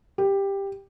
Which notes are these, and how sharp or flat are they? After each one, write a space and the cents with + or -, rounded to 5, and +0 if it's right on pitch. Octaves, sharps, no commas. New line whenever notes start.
G4 +10